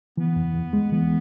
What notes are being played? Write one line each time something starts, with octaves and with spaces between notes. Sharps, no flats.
E3 B3
E2
E2
G#3
E3 B3